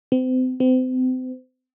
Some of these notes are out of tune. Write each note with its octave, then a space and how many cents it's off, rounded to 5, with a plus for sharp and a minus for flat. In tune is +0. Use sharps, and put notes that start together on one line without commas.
C4 -35
C4 -35